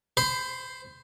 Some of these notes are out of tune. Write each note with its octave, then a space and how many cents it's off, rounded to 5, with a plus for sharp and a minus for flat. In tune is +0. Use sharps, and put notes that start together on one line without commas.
C5 +0 B5 +30